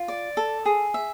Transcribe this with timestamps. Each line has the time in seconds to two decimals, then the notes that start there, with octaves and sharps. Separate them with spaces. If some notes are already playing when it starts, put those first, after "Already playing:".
Already playing: F4
0.08 D5
0.37 A4
0.65 G#4
0.94 E5